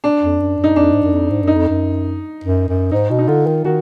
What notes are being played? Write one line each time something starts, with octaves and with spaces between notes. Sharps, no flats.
D4
F2
F#2
F#2
D#4
F2 D4
G#2
F#2
F2
G#2
F#2 D#4
F2
F#2
F#2
F#2
G#2 D#4
B2
D#4
D3 F4
D#3
D#3 F#4